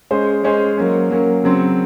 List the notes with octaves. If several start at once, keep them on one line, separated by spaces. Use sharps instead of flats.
G#3 C#4 G#4 C5
G#3 C#4 G#4 C5
F#3 A#3 C#4
F#3 A#3 C#4
C#3 F#3 C4